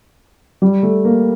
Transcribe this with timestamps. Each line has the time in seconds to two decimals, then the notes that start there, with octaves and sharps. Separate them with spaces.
0.62 G3
0.83 A3
1.05 A#3